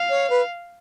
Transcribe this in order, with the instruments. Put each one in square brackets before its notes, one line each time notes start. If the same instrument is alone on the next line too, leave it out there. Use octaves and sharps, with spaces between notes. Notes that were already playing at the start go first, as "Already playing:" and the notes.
Already playing: [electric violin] F5
[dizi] C#5
B4